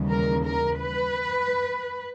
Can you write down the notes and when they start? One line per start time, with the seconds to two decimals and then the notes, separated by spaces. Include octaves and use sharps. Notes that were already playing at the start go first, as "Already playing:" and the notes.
Already playing: D#2 C#3 E3 G3
0.11 A#4
0.46 A#4
0.80 B4